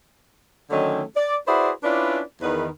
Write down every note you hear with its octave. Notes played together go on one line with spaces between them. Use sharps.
D3 D#3 F#3 A3 C#4 D#4
D5
E4 F#4 G#4 B4 C5 D5
C#4 D4 E4 F4 B4 D5
E2 D#3 B4